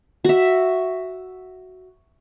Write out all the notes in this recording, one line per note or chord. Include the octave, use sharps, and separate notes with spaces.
F#4 E5